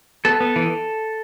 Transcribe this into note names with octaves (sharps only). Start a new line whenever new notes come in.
B3 A4
B3
E3